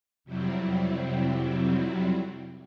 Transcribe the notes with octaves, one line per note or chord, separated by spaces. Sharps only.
F2 C3 F#3 G3 C4 E4